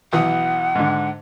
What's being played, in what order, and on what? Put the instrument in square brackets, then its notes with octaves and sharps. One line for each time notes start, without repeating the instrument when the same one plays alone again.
[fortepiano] B1 E3 D#6 [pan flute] F#5
[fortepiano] G#2 D3